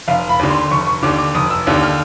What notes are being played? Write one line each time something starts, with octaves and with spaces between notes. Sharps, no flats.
F1 F5
B5
D#2 D3
C6
F1 C#6
C#6
D#2 D3 D6
D6
F1 D#6
E6
D#2 D3
F6